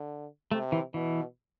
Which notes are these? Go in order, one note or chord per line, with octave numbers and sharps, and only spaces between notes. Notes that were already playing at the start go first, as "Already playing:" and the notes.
Already playing: D3
C3 A3
E3
B2 E3